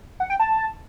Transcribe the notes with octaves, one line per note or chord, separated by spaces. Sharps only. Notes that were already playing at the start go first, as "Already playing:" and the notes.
F#5
G5
A5